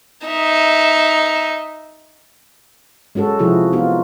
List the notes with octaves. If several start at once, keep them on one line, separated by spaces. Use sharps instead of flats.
D#4 E5
G#3 C#4 F#4 A4
C3 F3 E4 F#4 G#4
B3 D#4 F4 F#4